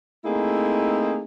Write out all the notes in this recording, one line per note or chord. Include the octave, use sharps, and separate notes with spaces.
A3 A#3 C4 D#4 E4 G#4